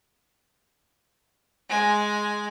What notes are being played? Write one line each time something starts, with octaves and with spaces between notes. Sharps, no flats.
G#3 G#5